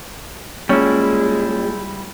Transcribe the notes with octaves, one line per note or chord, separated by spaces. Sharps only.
G3 G#3 A#3 C#4 E4 F4 A5